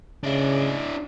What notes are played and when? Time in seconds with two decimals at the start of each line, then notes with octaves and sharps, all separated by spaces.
0.23 C#3 D4 E4